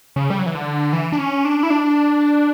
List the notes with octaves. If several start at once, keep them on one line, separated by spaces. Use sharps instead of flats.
C#3
G3
F#3
E3
D3
E3
D4
C#4
D4
E4
D4